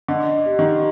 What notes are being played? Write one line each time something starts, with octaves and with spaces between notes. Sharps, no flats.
D3 D#5
G4
D#3